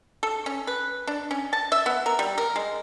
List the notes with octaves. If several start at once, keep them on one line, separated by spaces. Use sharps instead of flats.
A4
C#4
B4
D4
C#4
A5
E5
B3
A#4
G3
A#4
G#3